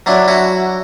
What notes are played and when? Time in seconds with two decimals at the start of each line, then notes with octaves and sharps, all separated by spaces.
0.06 F#3 D4 E4
0.28 E4 F#4